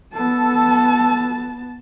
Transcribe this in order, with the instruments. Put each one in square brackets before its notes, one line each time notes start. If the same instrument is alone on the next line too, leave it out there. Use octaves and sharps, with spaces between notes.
[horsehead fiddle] B3 A5 [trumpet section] A4